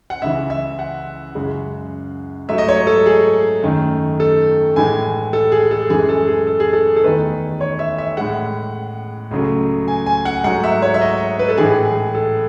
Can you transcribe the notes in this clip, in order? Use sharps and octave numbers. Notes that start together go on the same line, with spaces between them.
F#5
C#2 C#3 E3 E5
E5
F#5
F#2 C#3 G#3
G#2 F#3 A3 E5
D#5
C#5
A4
G#4
F#2 D#3 A3
A4
A2 E3 G#3 G#5
A4
G#4
A4
F#2 E3 G#3 G#4
A4
G#4
A4
G#4
A4
A4
E2 D#3 A3 B4
C#5
E5
E5
A2 G#3 F#5
C#2 C#3 F#3 A3
G#5
G#5
F#5
G#2 F#3 A3 F#5
E5
C#5
E5
D#5
B4
A4
A2 E3 G#3 G#4
A4